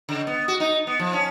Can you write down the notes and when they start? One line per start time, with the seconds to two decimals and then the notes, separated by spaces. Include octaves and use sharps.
0.09 C#3
0.27 B3
0.48 F#4
0.60 D#4
0.87 B3
1.00 F3
1.13 C#4